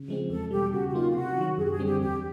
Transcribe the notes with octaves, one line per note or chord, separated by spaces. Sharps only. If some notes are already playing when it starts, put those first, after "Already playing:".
Already playing: C#3
F3 G#3 C4
E2 A4
B2 G3 G4
C#3 F#4
F#4
F#3 A#3 D#4 F4
G4
C3 F#4
D#3 F#3
F#2 G#4
G4
G#4
D3 G3 C4
G4
E2 G4